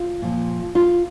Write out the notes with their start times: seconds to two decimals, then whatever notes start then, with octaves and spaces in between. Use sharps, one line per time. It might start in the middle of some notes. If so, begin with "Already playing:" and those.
Already playing: F4
0.22 A#2 F3
0.75 F4